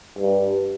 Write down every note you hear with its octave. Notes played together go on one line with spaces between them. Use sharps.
G2